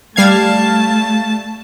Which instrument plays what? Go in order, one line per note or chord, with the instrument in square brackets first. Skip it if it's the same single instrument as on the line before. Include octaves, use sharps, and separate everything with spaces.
[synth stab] G3 F5 G#6 [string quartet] A3 A5